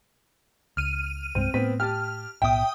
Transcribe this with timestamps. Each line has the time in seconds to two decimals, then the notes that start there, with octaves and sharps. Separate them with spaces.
0.77 C#2 F6 D#7
1.35 C2 G2 G#3 C4
1.54 A2 A3 B3 C4 B6
1.80 G4 A5 F6
2.42 B1 A2 B3 E5 G5 D#6